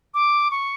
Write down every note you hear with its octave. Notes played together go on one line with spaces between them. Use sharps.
D6
C#6